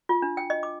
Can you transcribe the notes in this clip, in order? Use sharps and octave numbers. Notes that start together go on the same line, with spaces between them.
F4
D4
G5
D#5
D6